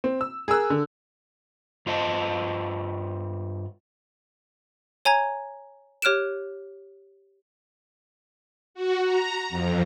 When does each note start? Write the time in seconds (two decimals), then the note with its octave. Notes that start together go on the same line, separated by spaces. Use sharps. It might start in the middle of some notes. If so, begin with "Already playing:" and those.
0.04 C4
0.21 E6
0.48 G#4 A#4 E6 F#6
0.70 D3
1.86 G2 F4 C5 D#5 G#5 A5
5.05 C#5 G#5 A#5 G#6
6.02 G4 C#5 F6 F#6 D7 E7
8.74 F#4
9.04 A#5
9.49 F2